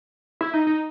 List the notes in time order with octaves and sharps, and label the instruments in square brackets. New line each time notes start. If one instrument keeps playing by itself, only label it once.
[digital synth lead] E4
D#4
D#4